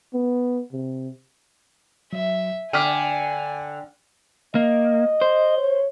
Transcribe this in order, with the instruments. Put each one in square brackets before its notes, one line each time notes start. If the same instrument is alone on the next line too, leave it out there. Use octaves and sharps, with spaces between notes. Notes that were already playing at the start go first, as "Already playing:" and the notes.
[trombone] B3
C3
[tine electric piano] F#3 [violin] E5
[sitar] D3 [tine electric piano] G5 B6 [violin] G#5 [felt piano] D6 F6 D#7
[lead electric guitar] A#3 [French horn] D#5
[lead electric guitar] C5
[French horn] C#5